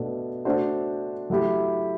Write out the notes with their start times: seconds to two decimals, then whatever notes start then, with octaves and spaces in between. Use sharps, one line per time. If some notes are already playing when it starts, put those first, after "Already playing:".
Already playing: B2 A3 D4 A4
0.45 A3 D4 F#4 C5
1.30 F#3 A3 E4 G4